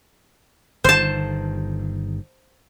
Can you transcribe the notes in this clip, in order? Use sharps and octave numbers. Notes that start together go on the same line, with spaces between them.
G1 D#3 C5 A5